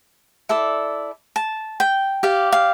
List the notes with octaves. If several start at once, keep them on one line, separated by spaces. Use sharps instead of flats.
E4 A4 D5
A5
G5
G4 D5 F5
F5